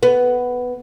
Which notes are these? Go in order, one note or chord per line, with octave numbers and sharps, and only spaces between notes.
B3